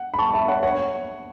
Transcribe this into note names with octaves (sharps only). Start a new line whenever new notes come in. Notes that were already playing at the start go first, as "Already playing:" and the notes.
Already playing: F#5
B5
A5 C#6
E5 A5
C#5 F#5
C#5 F#5